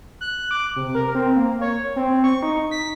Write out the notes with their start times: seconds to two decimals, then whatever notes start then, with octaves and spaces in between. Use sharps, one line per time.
0.21 F#6
0.51 D6
0.76 C3
0.95 A#4
1.15 C4
1.36 A#3
1.61 C#5
1.96 C4
2.24 C#6
2.43 D#4
2.71 B6